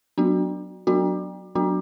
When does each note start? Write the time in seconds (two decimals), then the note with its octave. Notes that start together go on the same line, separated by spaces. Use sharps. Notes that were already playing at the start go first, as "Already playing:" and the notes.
0.18 F#3 B3 D4 F#4
0.87 F#3 B3 D4 F#4
1.55 F#3 B3 D4 F#4